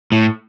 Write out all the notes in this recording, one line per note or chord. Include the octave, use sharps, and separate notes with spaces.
A2